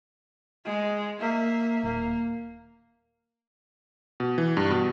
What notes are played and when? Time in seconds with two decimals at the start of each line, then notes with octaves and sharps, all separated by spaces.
0.65 G#3
1.19 A#3 E5
1.83 D#1 A#3
4.20 B2
4.38 E3
4.57 G2
4.70 B2